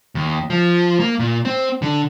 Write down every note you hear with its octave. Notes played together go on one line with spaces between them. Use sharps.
D#2
F3
A#3
A#2
C4
D3